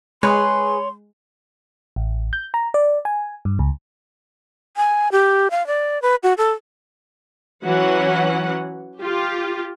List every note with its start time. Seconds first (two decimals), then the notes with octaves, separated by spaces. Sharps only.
0.23 G#3 G#4 B4 C#5 C6
1.96 A1
2.33 G6
2.54 A#5
2.74 D5
3.05 G#5
3.45 G2
3.59 C#2
4.77 G#5
5.12 G4
5.51 F5
5.67 D5
6.02 B4
6.23 F#4
6.38 A4
7.65 E3 F#3 C#4 F#5
9.01 F4 G4